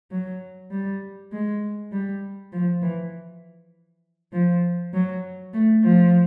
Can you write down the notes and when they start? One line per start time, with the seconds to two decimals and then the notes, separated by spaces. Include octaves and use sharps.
0.11 F#3
0.71 G3
1.32 G#3
1.92 G3
2.52 F3
2.82 E3
4.33 F3
4.94 F#3
5.53 A3
5.84 F3